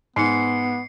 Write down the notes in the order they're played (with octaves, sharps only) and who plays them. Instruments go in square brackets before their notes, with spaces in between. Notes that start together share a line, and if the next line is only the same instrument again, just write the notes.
[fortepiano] G#2 [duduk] B3 [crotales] C7 C#7